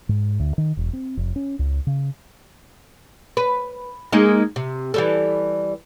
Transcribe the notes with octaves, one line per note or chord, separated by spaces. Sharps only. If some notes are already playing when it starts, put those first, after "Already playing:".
G#2
D2
D#3
E1
C4
F1
C#4
C#2
C#3
B4
G#3 A#3 D#4
C3
E3 G3 A4